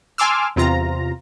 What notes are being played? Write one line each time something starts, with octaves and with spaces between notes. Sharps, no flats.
G#5 A5 C6 D6 E6 F6
E2 C3 F4 A#5